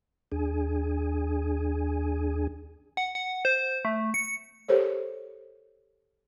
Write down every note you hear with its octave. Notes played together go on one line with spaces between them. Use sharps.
D#2 D4 G#4 G#5
F#5
F#5
C5
A3
C#7
G4 A4 A#4 C5 C#5